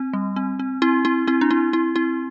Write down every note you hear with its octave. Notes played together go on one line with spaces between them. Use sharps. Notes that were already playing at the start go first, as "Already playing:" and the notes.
Already playing: C4
G3
C4
C4
C4 E4
C4 E4
C4 E4
D4
C4 E4
C4 E4
C4 E4